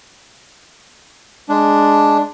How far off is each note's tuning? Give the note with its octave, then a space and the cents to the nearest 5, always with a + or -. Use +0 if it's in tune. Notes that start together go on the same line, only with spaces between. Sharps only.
G#3 +0 D4 +0